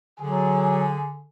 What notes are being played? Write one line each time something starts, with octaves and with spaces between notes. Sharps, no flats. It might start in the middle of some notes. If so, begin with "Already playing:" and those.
D3 F#3 G#4